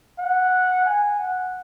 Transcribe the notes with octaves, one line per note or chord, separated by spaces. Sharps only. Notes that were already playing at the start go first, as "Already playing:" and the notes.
F#5
G#5
F#5